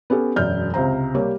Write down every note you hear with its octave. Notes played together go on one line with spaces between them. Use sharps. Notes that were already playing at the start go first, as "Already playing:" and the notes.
B3 C#4 G4 A4
E1 F#2 D5 F6 G6
C#2 C3 C5 A#5
G3 A#3 G4 C#5